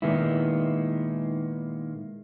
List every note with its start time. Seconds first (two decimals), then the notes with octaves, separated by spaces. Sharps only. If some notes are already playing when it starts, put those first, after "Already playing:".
0.02 A#2 D#3 G#3 A#3 B3 E4